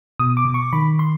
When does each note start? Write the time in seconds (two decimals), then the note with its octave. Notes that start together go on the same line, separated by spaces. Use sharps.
0.19 B2 D#6
0.37 D6
0.45 B2
0.54 C#6
0.73 D#3 B5
0.99 C6